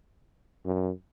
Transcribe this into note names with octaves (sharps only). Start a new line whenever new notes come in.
F#2